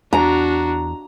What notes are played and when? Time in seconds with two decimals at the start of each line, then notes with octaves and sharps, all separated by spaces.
0.13 E2 D4 F#4 A#5